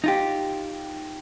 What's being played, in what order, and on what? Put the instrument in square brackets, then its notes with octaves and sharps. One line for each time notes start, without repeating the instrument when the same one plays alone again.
[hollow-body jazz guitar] D#4 F4 G4